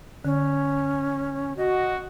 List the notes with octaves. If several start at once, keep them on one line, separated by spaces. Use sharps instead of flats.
D3 C#4
F#4 D#5